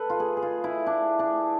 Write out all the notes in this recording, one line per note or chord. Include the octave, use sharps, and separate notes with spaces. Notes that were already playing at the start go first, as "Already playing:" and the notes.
Already playing: A4 B4
F4
G#4
G#4
F4
E4
D4
D4